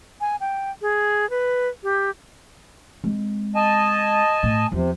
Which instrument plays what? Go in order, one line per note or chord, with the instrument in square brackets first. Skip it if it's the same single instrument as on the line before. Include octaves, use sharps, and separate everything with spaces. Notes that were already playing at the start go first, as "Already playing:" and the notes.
[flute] G#5
G5
G#4
B4
G4
[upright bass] G#3 C4
[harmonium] D#5 G#5 A5
[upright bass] A2
[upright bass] E2 F3 [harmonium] C3